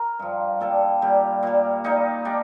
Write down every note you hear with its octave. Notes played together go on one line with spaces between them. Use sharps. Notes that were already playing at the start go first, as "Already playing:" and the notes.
Already playing: A#4
G2 F3
A#2 G3 A4
A#2 G3 G4
A#2 G3
A#2 G3 D#4
G3 D4